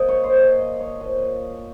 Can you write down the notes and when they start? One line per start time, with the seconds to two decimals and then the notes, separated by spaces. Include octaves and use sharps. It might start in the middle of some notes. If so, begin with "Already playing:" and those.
Already playing: A#2 F3 D#5
0.09 C#5
0.24 C5
0.38 A#2 F3 D#5
0.59 D#5
0.79 C#5
1.00 A#2 F3 D#5